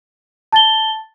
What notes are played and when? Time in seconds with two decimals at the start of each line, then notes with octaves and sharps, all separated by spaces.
0.52 A5 A6 G7